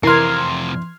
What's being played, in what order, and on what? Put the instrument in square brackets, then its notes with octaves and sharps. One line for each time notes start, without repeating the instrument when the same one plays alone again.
[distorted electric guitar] F2 C3 [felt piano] E3 C6 [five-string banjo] A#4 [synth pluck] F6 G#6 C7